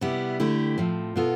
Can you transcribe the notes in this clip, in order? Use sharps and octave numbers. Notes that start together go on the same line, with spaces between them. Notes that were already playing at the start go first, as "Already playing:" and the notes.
C3 G3 B3 E4
D3 A3 E4 G4
A2 F3 C4
B2 B3 F4 A4